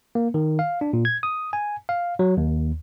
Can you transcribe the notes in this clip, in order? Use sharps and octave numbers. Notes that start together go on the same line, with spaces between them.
A#3
D#3
F5
D4
A#2
G#6
D#6
G#5
F5
F#3
D#2